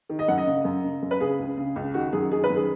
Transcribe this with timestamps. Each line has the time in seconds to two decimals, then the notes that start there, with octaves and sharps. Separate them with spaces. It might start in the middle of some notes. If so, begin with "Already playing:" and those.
0.09 D#3
0.19 D#5
0.28 F#2 F#5
0.38 D#5
0.47 C#3
0.65 F#2
0.84 C#3
1.02 F#2
1.11 B4
1.20 C#3 G#4
1.39 C#2
1.58 C#3
1.76 C#2
1.94 D#3 F#4
2.13 F#2 G#4
2.31 D#3 G#4
2.44 B4
2.50 F#2
2.56 G#4